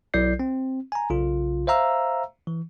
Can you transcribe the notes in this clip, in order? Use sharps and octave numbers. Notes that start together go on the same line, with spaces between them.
B1 F#3 E4 D5 G6 C7
C4
G#5 A#5
B1 C#3 F4
C5 E5 F5 A#5 E6
E3